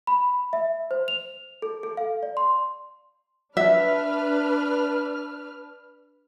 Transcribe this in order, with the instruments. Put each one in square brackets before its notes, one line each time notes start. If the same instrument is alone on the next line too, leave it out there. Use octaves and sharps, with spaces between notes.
[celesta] B5
E5
C5
F7
A4
A4
F5
D5
C6
[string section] D4 B4 F6 [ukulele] E5